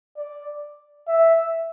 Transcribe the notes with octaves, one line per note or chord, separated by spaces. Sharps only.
D5
E5